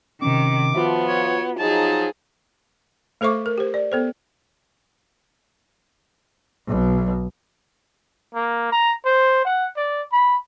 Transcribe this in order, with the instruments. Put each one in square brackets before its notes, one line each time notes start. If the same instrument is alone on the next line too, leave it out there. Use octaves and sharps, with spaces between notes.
[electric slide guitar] C3 C#4 [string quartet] D#3 [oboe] D6
[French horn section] F3 [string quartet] B3 [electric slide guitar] F4 F#4 E5
[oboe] C#5
[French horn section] F3 F#3 D#4 [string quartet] G#4 [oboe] A5
[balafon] A3 A4 C5 E5 C#6 D6
A#4
G4 C5
D5
B3 A4 C5
[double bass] B1 B2
[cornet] A#3
A#5
C5
F#5
D5
B5